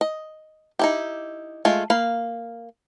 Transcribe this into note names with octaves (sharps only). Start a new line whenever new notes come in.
D#5
D#4 E4 G4
G#3 A3 F4
A#3 F5 B5